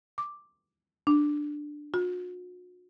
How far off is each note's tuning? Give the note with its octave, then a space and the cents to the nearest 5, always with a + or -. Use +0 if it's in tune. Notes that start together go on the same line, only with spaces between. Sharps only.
D6 +0
D4 +10
F#4 -45